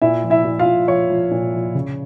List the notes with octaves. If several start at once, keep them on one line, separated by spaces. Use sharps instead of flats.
A#2 E4 E5
F3
E4 E5
A#2
F4 F5
A#2
F3 C#5
F3
A#2
F3
C#3